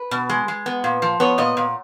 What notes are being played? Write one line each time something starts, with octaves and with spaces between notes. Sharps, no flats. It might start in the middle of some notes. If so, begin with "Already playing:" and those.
Already playing: B4
B2
G#3
G#3
B3
A#2
F3
B3 C#5
A#2 D#5
A#2